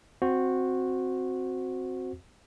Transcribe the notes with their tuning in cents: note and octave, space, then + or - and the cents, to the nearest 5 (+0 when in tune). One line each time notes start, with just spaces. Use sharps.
C4 +0 F#4 -10 C5 +0